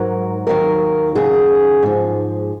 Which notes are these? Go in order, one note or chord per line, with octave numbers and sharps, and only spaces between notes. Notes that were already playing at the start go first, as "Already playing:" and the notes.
Already playing: G#2 F#3 A#4
D#2 D#3 F#3 A#4
D#2 C#3 F#3 G#4
G#2 F3